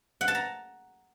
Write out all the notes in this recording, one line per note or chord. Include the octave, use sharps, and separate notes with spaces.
F#5
A5
A#5